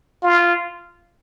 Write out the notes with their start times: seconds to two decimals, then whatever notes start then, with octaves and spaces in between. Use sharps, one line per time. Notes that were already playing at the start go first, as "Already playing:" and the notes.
0.23 F4